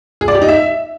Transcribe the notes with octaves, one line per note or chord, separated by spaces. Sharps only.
G#4
D5
G4
D#4
E5